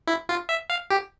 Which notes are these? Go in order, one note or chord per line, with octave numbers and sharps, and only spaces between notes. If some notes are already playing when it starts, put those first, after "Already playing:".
E4
F4
E5
F5
G4